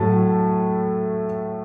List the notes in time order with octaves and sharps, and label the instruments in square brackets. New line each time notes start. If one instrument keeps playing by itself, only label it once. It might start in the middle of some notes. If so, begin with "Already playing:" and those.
Already playing: [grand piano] A2 F#3 A3 A5